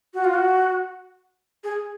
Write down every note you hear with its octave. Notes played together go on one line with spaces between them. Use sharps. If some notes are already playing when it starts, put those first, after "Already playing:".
F#4
F4
F#4
G#4